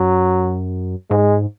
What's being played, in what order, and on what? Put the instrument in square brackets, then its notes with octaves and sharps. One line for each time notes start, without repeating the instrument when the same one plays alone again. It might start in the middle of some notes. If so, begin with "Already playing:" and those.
Already playing: [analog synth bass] F#2 [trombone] F#3
[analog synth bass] G#2 [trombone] G#3